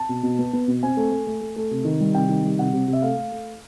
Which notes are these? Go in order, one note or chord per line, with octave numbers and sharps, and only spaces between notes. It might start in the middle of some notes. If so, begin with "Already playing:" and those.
Already playing: A5
B2
B2
B3
B3
B2
C4 G#5
A3
A3
A3
A3
A3
C3
D#3
G3
C3 G5
D#3
G3
C3 F#5
C3
C3
E5
A3 F5
A3
A3